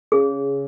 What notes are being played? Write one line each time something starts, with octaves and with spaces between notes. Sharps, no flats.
C#3 G#4